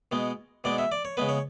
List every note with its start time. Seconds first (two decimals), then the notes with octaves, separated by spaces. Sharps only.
0.12 B2 G#3 B3
0.64 B2 G#3 B3 D5
0.78 E5
0.92 D5
1.05 C#5
1.17 C#3 G#3 B3 B4
1.29 C#5